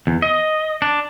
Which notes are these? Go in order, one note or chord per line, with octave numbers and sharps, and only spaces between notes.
E2
D#5
D4